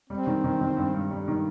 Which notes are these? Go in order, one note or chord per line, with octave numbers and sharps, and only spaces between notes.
G3 C4
D#3
D#3
D#3
G2
G2
G3
D#3